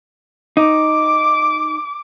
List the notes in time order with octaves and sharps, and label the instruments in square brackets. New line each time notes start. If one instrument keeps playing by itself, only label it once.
[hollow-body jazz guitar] D#4 [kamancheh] D6